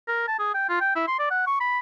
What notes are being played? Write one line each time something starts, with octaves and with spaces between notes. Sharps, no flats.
A#4
A5
G#4
G5
F4
G5
E4
C6
D5
F#5
C#6
B5